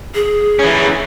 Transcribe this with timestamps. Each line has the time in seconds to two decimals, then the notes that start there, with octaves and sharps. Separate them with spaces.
0.15 G#4
0.59 E3 C#4